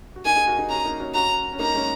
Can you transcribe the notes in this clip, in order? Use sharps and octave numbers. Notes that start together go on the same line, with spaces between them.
F#4
A#3 D#4 G#5
D#4 G#4
F#4 A#4
D#4 G#4
C#4 F#4 A#5
A#3 D#4
C#4 F#4
C#4 F#4 A#5
C#4
A#3 D#4 A#5
G#3 C#4